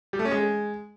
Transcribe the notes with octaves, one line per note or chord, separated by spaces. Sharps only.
G3
A3
C#4
G#3